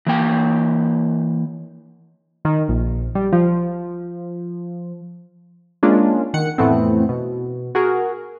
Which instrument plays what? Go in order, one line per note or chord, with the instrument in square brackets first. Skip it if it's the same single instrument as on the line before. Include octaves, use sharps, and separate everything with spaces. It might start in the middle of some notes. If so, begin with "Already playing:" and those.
[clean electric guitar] E3 A#3 G5
[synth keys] D#3
A#1
G3
F3
[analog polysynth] G#3 A#3 C#4 D4 F4
D#3 F#5 C#7
F2 A2 E3 A3 B3 C4
B2
F#4 G#4 A#4